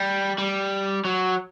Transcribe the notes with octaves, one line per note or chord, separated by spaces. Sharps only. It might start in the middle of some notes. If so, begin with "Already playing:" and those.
Already playing: G3
G3
F#3